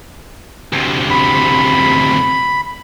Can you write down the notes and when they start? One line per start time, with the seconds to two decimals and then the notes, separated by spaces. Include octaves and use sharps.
0.73 D2 C3
1.10 B5